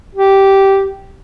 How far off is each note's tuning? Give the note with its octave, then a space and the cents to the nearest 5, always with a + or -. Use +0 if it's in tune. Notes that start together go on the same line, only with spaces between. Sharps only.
G4 -10